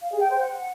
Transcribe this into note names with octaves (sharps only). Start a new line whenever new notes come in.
F5
G#4
G5
C5
F#5